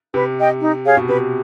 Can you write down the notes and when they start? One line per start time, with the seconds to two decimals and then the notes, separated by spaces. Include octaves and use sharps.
0.14 C3 B4
0.38 D#5 G5
0.61 D#4
0.85 G#4 C#5 F5
0.97 B2
1.08 C3 B4